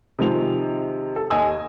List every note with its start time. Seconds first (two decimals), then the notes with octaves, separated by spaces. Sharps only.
0.19 C3 D#3 F3 G#3 F7
1.16 A4
1.30 D#2 D#5 G#5 E6